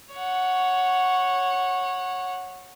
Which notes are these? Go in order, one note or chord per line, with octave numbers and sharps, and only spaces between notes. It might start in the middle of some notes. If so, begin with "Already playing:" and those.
C#5 F#5